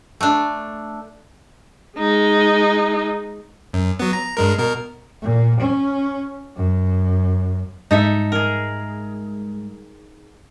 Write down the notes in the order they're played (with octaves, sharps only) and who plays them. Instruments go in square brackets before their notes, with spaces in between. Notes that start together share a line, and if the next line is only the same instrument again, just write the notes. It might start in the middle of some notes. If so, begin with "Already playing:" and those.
[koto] A3 D4
[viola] G#3 D#4
[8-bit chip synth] F#2
F#3 B3
A#5
G2 G#3 A#4
B2 A#4
[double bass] A#2
C#4
F#2
[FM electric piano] G#2 G3 G#3 [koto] D#4 A4 E5
[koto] G#4 A#4